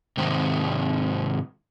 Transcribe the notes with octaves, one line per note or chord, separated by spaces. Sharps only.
G#2 C3 D#3